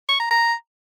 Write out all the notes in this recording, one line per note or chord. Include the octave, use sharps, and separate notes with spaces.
C#6
A#5
A#5